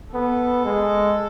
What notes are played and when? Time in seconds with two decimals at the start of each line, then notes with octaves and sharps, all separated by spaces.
0.13 B3 A4
0.65 G#3